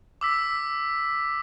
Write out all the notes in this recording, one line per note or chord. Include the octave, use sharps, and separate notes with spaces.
D6 E6 B6